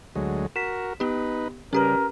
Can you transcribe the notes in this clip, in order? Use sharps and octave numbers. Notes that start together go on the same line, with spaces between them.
D2 F#3 G#3
F#4 A#4 B6 E7
B3 D#4 G4 B4
C#3 G3 C#4 G4 A#4 B4